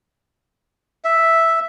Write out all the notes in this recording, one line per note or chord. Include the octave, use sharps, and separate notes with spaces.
E5